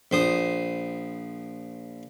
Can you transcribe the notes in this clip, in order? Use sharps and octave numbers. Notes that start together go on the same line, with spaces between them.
A#1 C5 D#6